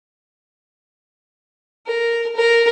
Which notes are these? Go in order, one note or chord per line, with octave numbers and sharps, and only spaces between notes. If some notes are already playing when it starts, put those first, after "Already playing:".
A#4
A#4